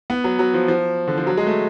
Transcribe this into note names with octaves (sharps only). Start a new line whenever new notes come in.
B3
F#3
F#3
F3
F3
D3
F3
F#3
G#3
A3